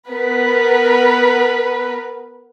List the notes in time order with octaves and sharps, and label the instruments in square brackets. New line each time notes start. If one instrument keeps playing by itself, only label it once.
[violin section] B3 A#4 B4